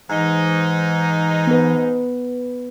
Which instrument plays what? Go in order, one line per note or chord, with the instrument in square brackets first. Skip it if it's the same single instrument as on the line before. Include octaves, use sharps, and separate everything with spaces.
[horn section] G#2 D#4 [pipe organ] E3
[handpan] B3 B4